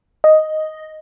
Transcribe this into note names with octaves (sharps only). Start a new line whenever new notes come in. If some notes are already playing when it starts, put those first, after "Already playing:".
D#5